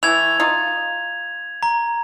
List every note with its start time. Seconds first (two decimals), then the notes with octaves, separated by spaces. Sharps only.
0.03 E3 A3 G#6 F7
0.40 D#4 F4
1.63 A#5